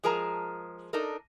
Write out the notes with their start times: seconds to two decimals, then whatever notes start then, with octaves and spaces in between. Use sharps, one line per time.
0.03 F3 G#3 G#4 A#4 A5 A#5
0.93 D4 D#4 A4 A#4